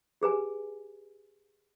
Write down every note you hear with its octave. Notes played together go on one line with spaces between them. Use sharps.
G4 G#4 B4 G#5